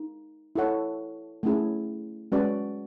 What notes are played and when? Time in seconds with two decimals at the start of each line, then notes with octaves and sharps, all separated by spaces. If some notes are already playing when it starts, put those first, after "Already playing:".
Already playing: D#4
0.56 E4 A4 C#5 F#5
1.43 A3 C#4 E4 G#4
2.32 G#3 C#4 F#4 B4 D5